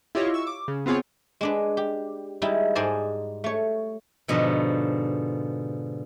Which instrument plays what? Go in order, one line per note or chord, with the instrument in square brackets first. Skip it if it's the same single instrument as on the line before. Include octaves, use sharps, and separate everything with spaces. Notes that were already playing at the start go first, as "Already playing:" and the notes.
[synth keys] E4 F4 G4 C#5 D#5
C#6 E6
D6
C#3
B3 C4 F4 G#4 C#5
[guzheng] G#3 D4 B4
G4
G3 G#3 D#4 E4
G#2 G#4 C5 D5 D#5 A5
A3 C#5
G#2 B2 D3 F3